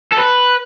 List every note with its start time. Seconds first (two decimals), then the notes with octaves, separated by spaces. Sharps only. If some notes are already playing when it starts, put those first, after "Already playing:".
0.12 A4
0.18 B4